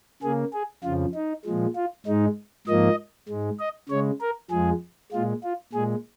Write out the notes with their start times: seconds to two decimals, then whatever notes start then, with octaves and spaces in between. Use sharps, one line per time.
0.22 C#3 A#3 G#4
0.53 G#4
0.83 F2 C#3 F3 F4
1.14 D#4
1.46 A#2 F3 G#3
1.76 F4
2.06 G#2 G#3 D#4
2.67 G#2 F3 A#3 D#5
3.29 G#2 G#3
3.59 D#5
3.89 C#3 G#3 C#5
4.21 A#4
4.51 F2 F3 G#3 G#4
5.12 A#2 G#3 F4
5.43 F4
5.73 A#2 G#3 G#4